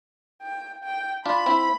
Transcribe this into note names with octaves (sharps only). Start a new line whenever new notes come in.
G5
G5
D4 F4 B5
C4 E4